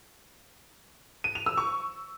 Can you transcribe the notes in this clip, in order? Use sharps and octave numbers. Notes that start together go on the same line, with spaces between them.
D#7
F7
E6
C#6